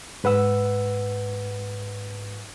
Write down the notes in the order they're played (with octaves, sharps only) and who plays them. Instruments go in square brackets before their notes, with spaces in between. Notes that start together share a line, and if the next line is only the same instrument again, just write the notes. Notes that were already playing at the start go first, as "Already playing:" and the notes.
[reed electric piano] G#2 B4 F#5 E6